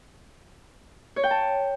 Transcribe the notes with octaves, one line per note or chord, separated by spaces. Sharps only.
C#5
G5
A5